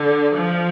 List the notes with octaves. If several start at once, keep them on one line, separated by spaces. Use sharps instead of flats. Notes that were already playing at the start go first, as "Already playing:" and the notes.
Already playing: D3
F3